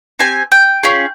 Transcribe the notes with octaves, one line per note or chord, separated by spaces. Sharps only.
C4 G4 G#5
G5
C#4 F4 G#4